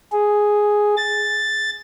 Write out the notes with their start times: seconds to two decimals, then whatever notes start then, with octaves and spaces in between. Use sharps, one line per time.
0.12 G#4
0.97 A6